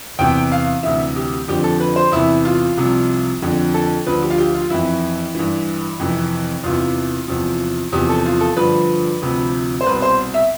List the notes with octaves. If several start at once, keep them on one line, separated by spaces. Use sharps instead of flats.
E2 C3 E3 G5
F5
D2 C3 E3 E5
G4
F2 D3 F3 G4
A4
B4
C5
E2 C3 E3 E4
F4
C2 C3 F3
F2 D3 F3
A4
D2 D3 F3 B4
G4
F4
G4
F4
F2 E3 E4
G2 E3
F2 C3 E3
E2 C3 E3 F4
E2 C3 F3
E2 C3 F3 G4
A4
F4
A4
G2 D3 F3 B4
D2 C3 F3
C5
C2 B2 B4
C5
E5